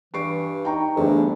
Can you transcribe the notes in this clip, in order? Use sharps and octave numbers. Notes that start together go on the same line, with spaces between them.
G2 E3 C#6 C7 D7
D#4 G5 A#5 C#6
G1 E2 G2 A3 D4 G#4 A4 C5